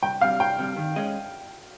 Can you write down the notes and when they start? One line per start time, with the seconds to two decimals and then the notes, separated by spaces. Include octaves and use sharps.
0.02 C2 G5
0.21 C3 G3 F5
0.40 C2 G5
0.59 C3 G3
0.76 D#3
0.96 G#3 C#4 G#4 D#5